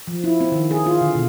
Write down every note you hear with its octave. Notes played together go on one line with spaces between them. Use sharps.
F3
E4
C4
D#3
G#4
F4
D3
B2